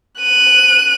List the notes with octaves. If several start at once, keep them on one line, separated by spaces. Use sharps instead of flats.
F#6 D#7